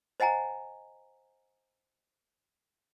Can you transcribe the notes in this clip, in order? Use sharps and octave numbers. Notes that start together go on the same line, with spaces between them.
C5 D#5 F#5 G#5 A#5